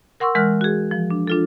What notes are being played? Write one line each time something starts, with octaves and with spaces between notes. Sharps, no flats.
A#4 F#5 C6 C#6 E6
E3 G#3 A#4 F#5 F6 F#6
F#4 G#4
F3
D4
D4 F4 A4